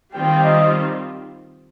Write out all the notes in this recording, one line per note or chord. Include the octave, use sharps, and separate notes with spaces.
D#3 G3 C4 F4 G5
D#5